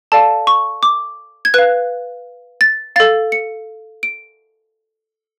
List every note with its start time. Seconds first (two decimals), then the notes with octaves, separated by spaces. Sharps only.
0.12 A4 D5 F5 A5
0.47 C#6
0.83 D6
1.45 G#6
1.54 B4 F5 F#6
2.61 A6
2.96 A4 F5 A6
3.32 C#7
4.03 D7